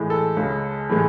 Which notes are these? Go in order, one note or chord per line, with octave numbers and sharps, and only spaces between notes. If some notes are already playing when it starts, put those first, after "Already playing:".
Already playing: A2 E3 G#3
A4
C#2 C#3 G#3
A2 E3 G#3